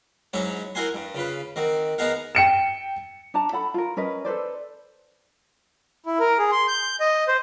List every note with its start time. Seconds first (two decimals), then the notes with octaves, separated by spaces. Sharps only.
0.33 G#2 F#3 C#4 E4 C#5
0.75 E4 F#4 A#4 F#5 G#5 C6
0.94 G2
1.15 C#3 F4 B4
1.56 D#3 C4 F#4
1.98 B3 D#4 G#4 A#4 F5 F#5
2.35 G5 C#7 E7
3.34 D4 A5 A#5
3.52 A4 F#5 B5
3.74 F4 A#4
3.97 C#4 A#4 B4 D#5
4.25 A4 B4 C5 D5
6.06 E4
6.20 A#4
6.39 G#4
6.51 C6
6.68 G6
7.00 D#5
7.28 C5